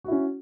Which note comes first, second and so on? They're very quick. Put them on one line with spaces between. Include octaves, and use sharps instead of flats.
F#4 E4 C#4